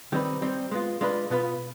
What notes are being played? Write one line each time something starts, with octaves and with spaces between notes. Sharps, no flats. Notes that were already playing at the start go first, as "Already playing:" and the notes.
D#3 G3 C4 D#4 B4
G3 C4 D#4
G#3 B3 F4
G#3 D4 F4 B4
B2 B3 F4 B4